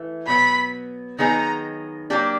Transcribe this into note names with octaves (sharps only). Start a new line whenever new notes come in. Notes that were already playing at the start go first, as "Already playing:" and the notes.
Already playing: E3 A3
B2 F#3 B3 B5
D#3 F#3 B3 D#4 G#4 A#5
F#3 A#3 D4 G4